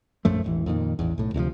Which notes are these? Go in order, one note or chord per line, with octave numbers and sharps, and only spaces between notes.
A#1 F#2 F3 A3
E1 A1 E3
F2 A#2 D#3
A1 E2
B1 A2
D2 C3 E3 F3